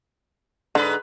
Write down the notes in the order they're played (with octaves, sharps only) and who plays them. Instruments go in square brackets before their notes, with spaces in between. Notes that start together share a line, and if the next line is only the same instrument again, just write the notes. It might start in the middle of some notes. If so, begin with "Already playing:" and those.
[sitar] G#2 B4 [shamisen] D3